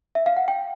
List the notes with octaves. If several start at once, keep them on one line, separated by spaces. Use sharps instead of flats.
E5
F5
F#5
G5